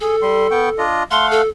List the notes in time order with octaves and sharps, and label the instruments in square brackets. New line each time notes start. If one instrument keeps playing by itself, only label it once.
[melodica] G#4 [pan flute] A4
[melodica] G3 C6
B3 G5 C#6
D4 F4 D#5
[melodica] A3 F5 F#5 [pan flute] C6
[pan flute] A4